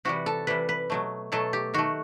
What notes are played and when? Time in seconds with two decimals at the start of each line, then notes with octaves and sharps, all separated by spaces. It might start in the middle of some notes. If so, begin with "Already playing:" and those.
0.05 C3 E3 G3 F#4
0.26 A4
0.47 C3 E3 G3 B4
0.69 B4
0.90 B2 F#3 A3
1.32 B2 F#3 A3 A4
1.53 G4
1.74 D#3 A3 F#4